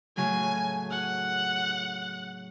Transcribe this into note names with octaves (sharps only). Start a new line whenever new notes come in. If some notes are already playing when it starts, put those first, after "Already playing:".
A2 C#3 F#3 G#5
F#5